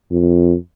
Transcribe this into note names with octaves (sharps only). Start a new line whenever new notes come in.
F2